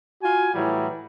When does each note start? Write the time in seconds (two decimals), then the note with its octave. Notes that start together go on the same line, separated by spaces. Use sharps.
0.22 F4 F#4 G#5
0.55 A2 E3 F#3 G3